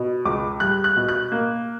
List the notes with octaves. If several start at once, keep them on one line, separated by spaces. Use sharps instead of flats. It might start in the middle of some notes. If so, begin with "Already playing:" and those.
Already playing: B2
C#2 D6
G3 F#6
F#6
B2
F#6
A#3